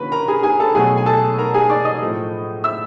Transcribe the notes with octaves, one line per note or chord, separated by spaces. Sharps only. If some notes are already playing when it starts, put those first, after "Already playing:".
Already playing: D3 F3 A#3 C#4 B4 B5
A#4 A#5
G#4 G#5
G#4 G#5
A4 A5
B2 F#3 A3 G#4 G#5
G#5
A4 A5
A#4 A#5
G#4 G#5
D5 D6
D#5 D#6
A2 F3 A3
E5 E6